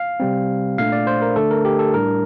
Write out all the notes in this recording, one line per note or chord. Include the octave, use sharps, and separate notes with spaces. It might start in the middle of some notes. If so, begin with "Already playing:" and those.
Already playing: F5
C3 G3 C4
A#2 A3 D4 F5
D5
C5
A#4
D3 A3 D4 A4
A#4
G4
A4
A2 G3 D4 A#4